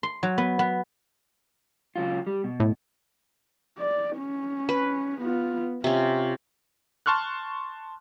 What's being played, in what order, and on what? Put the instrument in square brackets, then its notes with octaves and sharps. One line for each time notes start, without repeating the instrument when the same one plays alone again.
[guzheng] C6
F#3
B3
B3
[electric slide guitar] C#3 F#3 F4
G3
B2
[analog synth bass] A2
[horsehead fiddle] D5
C#4
[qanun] B4
[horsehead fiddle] B3 F4
[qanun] C3 C#4 [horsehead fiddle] F4
[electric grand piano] A5 C6 C#6 F6 F#6